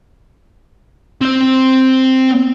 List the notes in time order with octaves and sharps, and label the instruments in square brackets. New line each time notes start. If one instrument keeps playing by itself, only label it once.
[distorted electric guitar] C4 C5